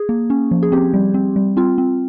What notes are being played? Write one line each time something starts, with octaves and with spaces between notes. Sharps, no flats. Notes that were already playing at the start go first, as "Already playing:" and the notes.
Already playing: G#4
A#3
C#4
F3
G#4
C4 G4
G3
C4
G3
C4 F4
C4